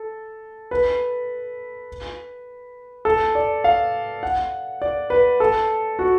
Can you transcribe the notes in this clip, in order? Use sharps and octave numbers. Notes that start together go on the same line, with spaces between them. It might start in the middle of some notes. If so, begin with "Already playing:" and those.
Already playing: A4
B4
A4
D5
F5
F#5
D5
B4
A4
F#4